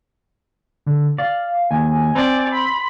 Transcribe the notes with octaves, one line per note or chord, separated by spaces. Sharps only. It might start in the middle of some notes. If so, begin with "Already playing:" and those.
D3
D5 F5
D#2 G#5
C4 D5
B5 C6